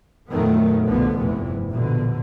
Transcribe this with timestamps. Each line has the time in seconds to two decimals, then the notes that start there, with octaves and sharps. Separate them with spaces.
0.31 F2 A#2 D#3 F#3 A3 B3
0.86 B1 G#2 B2 D3 F3 B3
1.18 F1 E2 G2 C3 E3
1.69 A#1 E2 B2 D3